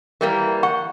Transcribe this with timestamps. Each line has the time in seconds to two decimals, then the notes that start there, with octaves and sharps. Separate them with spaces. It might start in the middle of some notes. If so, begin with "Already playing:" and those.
0.21 E3 G3 A#3 A#4
0.63 F#5 C#6